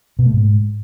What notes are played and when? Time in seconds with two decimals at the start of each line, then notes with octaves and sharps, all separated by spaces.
0.19 B2
0.26 A3
0.33 G#2